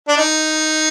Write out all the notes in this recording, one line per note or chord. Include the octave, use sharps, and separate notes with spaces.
D4
D#4